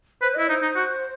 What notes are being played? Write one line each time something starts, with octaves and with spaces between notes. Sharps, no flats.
B4 C5
E4 D#5
D#4 C5
D#4
F#4